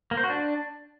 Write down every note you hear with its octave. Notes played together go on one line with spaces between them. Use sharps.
A#3
C5
F#4
D4